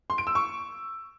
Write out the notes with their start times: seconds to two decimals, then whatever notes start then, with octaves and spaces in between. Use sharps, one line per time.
0.10 C6
0.18 D7
0.27 E6
0.35 C#6